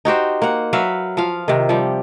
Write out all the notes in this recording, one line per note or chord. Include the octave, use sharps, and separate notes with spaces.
D#4 F#4 G4 C5
A#3 F#5
F#3 B4 E5 F5
F3 F5
C3 D#3
F3 G3